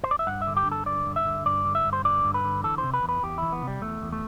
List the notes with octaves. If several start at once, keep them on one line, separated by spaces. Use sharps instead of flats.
C5
D5
E5
G2 F#5
E5
D3
G4
G2
A4
D3 D5
G2
E5
D3
G2 D5
D3
E5
G2
C5
D3 D5
G2
B4
D3
E3 A4
C3 C5
B4
E2
B4
E2 G4
E3 E4
B3
C3
G3
E2 A3
E2
A3